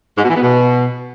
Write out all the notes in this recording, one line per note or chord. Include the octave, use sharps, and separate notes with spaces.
G#2
B2
E3
B3
B2